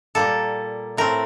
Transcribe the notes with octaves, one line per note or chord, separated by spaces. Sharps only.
A#2 G3 A#3 A4
A2 A3 C4 A#4